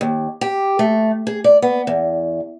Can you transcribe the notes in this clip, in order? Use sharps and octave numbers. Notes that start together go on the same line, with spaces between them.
D#2
G4
A3
G#4
D5
B3
E2